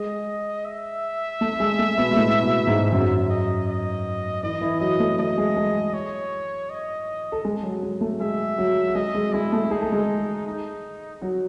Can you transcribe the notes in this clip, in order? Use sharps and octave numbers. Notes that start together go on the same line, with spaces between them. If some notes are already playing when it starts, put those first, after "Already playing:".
Already playing: G#3 G#4 D#5
E5
A3 A4
G#3 G#4
A3 A4
B2 B3
G#3
A2 A3
B2 B3
G#2 G#3
F#2 F#3 E5
D#5
D#5
E3 E4 D#5
E3 E4
F#3 F#4 D#5
A3 A4
A3 A4 D#5
G#3 G#4
G#3 G#4
C#5
D#5
A4
G#3 G#4
F#3 F#4
G#3 G#4
A3 A4
G#3 G#4 E5
F#3 F#4
F#4
G#3 G#4 D#5
G#3 G#4
G#3 E4 G#4
A3 A4
D#4 G#4
A4
G#3 G#4
D#4
F#3 F#4